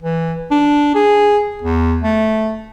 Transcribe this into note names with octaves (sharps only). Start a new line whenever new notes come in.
E3
D4
G#4
E2
A3